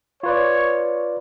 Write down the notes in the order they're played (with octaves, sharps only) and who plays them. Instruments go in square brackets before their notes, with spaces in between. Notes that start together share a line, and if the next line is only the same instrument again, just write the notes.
[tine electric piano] F4 B4 D5 [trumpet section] C#5